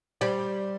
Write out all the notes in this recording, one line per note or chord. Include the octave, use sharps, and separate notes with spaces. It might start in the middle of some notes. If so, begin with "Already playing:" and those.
G3 C5 D5